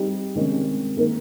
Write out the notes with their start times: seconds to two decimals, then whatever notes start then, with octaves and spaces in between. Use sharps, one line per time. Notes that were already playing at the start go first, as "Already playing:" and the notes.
Already playing: G3 C4 D#4 G4
0.35 C3 D#3 G#3 C#4
0.97 D#3 A#3 D#4 A#4